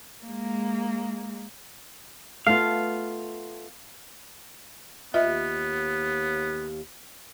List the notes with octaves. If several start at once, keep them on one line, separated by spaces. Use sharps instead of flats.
G#3 A#3
A3 B3 F4 F5
D#2 B3 F4 B4 D#5 E5